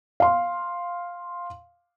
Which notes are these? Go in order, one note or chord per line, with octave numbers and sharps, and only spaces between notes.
F5 C6